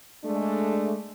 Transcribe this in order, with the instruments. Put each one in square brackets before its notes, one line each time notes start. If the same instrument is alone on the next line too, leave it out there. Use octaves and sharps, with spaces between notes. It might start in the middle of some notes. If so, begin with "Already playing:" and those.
[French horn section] G#3 A3 D4